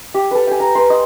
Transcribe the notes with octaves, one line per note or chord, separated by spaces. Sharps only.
G4
A4 B4
G5 G#5
A#5
B4 C6
D#5